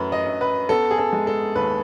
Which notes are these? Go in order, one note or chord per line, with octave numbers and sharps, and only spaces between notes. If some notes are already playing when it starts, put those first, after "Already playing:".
Already playing: F#2 E3 A3 B4
D#5
F#2
B4
B3 A4
G#4
A4
G#3
A4
D#2 B4